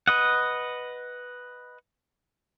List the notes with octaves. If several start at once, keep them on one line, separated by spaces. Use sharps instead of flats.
B4 D#5 F#5